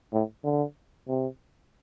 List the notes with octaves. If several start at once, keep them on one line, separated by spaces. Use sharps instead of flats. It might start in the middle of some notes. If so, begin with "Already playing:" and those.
A2
D3
C3